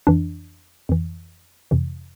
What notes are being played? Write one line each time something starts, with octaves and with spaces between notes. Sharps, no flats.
F2 E3 D4
F2 E3
F2 C3 E3